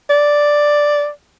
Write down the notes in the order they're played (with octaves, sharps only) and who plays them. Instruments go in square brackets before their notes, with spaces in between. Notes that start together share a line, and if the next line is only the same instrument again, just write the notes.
[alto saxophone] D5